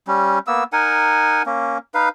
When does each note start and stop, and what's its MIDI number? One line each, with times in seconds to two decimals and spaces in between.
0.07 0.39 55
0.07 0.39 61
0.47 0.64 58
0.47 0.64 59
0.47 0.64 88
0.73 1.42 63
0.73 1.42 70
0.73 1.42 78
0.73 1.42 80
1.46 1.78 58
1.46 1.78 61
1.94 2.09 63
1.94 2.09 71
1.94 2.09 77